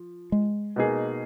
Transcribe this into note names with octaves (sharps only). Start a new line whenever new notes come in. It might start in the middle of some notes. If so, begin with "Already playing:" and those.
Already playing: F3
G#3
B2 A#3 D#4 G#4